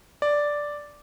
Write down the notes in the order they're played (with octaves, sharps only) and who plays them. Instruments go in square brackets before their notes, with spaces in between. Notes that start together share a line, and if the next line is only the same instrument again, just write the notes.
[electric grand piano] D5